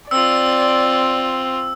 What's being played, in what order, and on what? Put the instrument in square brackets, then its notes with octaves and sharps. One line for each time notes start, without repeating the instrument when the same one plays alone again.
[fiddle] C4 F4 [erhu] D5 [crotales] E6